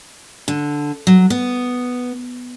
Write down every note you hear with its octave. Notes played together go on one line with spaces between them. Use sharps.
D3
F#3
B3